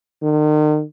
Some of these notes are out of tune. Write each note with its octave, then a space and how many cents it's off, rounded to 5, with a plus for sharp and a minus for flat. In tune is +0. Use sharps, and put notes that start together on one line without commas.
D#3 -40